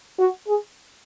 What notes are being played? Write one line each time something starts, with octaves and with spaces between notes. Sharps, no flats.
F#4
G#4